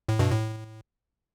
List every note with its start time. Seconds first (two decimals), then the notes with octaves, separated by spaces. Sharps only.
0.09 A2
0.19 G2 B2
0.30 A2